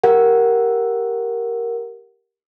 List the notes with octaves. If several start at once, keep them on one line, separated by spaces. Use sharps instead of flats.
G4 A#4 F#5